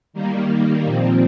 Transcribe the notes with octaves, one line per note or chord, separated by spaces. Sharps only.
D#3 G3 A#3
A#2 F3 C4